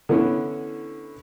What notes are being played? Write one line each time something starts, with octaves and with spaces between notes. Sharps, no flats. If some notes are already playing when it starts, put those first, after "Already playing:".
D3 E3 B3 C#4 E4